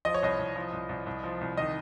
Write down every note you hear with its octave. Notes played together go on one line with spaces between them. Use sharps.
F3 D#5
C#5
C2 D#5
C2
F3
C2
C2
C2
F3
C2
D#3 D#5